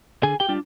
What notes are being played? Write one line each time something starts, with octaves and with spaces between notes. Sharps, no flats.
D3 G#4 G#5
G4 G5
G3 D4 F4